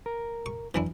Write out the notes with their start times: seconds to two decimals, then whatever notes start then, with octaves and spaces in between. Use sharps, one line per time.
0.06 A#4
0.46 C#6
0.74 F#2 E3 D4 E4